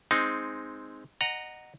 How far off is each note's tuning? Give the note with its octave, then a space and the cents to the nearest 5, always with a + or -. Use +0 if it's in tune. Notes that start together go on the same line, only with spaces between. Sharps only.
G#3 +0 C4 +0 D#4 +5
D#5 -20 F#5 +0 A#5 +0